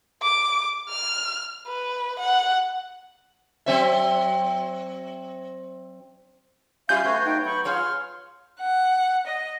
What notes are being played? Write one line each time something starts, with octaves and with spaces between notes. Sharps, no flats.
D6
F6
B4
F#5
F#3 C4 E5
F#3 G3 C#4 F4 E5 F5 G#5 G6
A3 B3 F#4 C#5
D#4 E5 G5
F#3 B5 C#6
F4 G#4 C#5 C6 F6
F#5
D#5